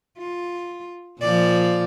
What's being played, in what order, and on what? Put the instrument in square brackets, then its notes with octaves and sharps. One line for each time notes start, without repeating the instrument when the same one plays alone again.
[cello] F4
[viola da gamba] A#2 F3 [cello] D5